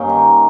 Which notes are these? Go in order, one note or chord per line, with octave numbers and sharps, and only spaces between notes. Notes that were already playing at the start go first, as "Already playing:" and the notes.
Already playing: G2 A#3 C#4 D#4 A#4
D#3